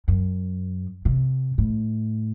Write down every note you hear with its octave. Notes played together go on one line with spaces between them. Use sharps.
F#2
C3
A2